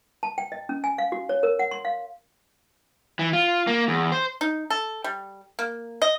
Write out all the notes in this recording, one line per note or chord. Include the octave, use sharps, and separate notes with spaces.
A5
G5
D#5
C#4
G#5
F5
F#4
C#5
A#4
F#5
C6
F5
E3
F4
A#3
E2
C5
D#4
A4
G3
A#3
D#5